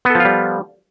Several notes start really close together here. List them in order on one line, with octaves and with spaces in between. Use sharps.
B3 A4 F3 F4 G3